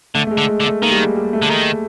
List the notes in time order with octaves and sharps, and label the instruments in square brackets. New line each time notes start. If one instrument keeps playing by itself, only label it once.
[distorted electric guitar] D3 [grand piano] A3
[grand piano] A3
G#3
[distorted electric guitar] D3
[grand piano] G#3
[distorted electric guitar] D3
[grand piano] A3
[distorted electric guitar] D#3 [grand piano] A#3
[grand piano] G3
G#3
G3
A3
[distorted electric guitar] D3
D#3